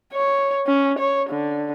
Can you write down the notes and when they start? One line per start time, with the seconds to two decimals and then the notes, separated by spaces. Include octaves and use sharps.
0.13 C#5
0.67 C#4
0.99 C#5
1.30 D3